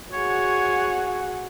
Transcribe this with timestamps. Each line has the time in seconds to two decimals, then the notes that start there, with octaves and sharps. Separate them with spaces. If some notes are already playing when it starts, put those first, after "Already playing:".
0.12 F#4 G#4 C#5 F#5